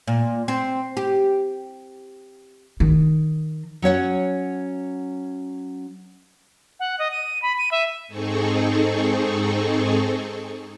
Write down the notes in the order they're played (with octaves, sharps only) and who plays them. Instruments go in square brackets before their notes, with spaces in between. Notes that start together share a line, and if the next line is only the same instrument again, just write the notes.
[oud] A#2
C4
G4
[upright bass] D#3
[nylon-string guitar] F#3 C#4 C#5 F#5
[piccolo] F#5
D#5
D#7
B5
D#7
E5
[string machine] G#2 C4 D#4 G#4 A4 C#6